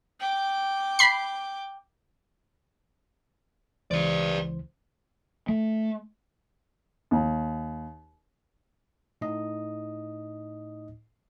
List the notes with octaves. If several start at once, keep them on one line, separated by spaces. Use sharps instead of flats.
G5 D6
B5 C7
C#2 E3 B4 C5 D5
A3
D#2
A2 D#4 D#5